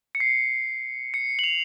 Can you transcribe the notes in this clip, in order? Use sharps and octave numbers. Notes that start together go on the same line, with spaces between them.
C#7
C7
C#7
F#7
F7